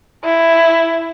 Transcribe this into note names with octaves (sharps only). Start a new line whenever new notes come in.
E4